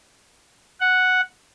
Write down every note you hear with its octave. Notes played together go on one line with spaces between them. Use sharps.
F#5